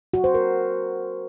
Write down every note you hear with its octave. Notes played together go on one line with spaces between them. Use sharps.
F#4
C5
A#4